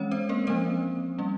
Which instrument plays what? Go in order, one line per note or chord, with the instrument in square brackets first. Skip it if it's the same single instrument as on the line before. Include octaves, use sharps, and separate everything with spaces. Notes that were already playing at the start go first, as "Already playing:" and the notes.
Already playing: [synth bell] E3 G#3 C4 C#4 C#5
C4 C5
A#3 A#4
F3 A#3 C4 C#4 C5
G3 A#3 C#4